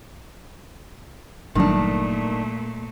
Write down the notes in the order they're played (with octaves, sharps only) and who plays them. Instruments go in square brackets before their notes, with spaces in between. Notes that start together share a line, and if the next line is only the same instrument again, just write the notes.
[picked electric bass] G1 F#3 G3 [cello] A#2 A3 [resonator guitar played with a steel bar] D#3 D4